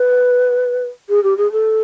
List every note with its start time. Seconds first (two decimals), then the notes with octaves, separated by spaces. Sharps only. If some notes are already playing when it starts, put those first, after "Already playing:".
Already playing: B4
1.09 G#4
1.23 G4
1.38 G#4
1.52 A4